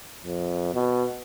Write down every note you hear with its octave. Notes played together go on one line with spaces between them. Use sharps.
F2
B2